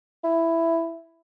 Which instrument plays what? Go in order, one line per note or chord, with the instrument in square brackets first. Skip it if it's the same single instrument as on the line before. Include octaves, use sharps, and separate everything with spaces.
[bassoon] E4